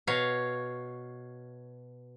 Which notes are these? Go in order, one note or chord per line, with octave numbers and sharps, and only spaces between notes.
B2 C#5 F5